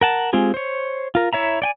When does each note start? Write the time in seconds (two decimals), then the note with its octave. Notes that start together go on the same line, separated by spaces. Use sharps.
0.01 A#4 F#5 A5
0.33 G#3 C4 F4 G4 G#4
0.54 C5 C#5
1.15 F4 A#4
1.33 E4 C#5 E5 A#5
1.62 D5 G5 G#5